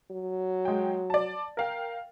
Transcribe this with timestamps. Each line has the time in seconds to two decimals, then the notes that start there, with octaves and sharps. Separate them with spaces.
0.11 F#3
0.65 G#3 G5
1.10 D5 A5
1.57 A#4 F5 G5